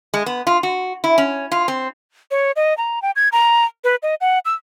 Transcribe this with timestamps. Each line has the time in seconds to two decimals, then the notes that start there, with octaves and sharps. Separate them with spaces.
0.14 G#3
0.26 B3
0.47 F4
0.63 F#4
1.04 E4
1.18 C#4
1.52 F4
1.68 C4
2.31 C#5
2.56 D#5
2.78 A#5
3.02 G5
3.16 G#6
3.32 A#5
3.84 B4
4.03 D#5
4.21 F#5
4.45 E6